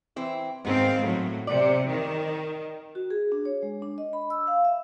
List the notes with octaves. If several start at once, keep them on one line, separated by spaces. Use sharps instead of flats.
E3 C4 E4
G#2 D#3 B3 C4 F5
A2 F#3
C3 D5
D#3
F#4
G#4
D4
C#5
G#3
D4
D#5
B5
E6
F5
E5